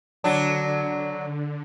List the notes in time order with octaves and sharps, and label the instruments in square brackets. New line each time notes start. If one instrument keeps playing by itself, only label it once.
[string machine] D3 [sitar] F#3 D4